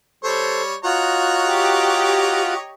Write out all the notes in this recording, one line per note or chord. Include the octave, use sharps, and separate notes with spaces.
G3 A4 C5 C#5
F4 F#4 C#5 D#5 A#5 F#6
G4